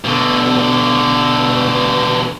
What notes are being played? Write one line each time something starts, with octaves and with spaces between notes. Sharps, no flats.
B2 D3